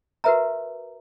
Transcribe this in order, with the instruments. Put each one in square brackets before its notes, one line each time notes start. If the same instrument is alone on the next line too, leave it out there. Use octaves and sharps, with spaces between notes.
[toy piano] F#4 A#4 B4 E5 A#5